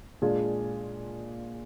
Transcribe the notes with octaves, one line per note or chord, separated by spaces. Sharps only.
A#2 G#3 D4 F4 G#4